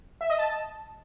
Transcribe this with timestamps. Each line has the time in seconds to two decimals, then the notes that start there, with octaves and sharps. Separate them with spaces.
0.21 E5
0.30 D#5
0.39 A5